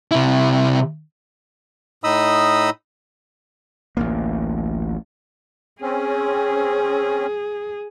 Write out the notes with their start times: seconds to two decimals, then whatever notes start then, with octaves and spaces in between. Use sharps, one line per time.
0.11 C3 E4
2.04 A2 D#4 D#5 B5 D#6 E6
3.97 A1 D2 A#3
5.82 C4 C#4 G#4